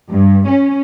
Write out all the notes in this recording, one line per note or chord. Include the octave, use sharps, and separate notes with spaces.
G2
C#4